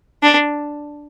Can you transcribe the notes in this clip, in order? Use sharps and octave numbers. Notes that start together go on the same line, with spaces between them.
D4